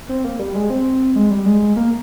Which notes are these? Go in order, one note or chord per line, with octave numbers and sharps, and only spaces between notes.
C4
A#3
G3
G#3
C4
G#3
G3
G#3
A#3